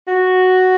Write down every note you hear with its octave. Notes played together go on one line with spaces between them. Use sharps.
F#4